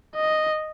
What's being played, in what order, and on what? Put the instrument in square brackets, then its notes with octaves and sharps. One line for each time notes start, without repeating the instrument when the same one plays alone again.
[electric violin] D#5